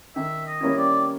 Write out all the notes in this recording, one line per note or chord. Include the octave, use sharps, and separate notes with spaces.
D#3 E5
D#5
G3 A#3 C#4 E4
D5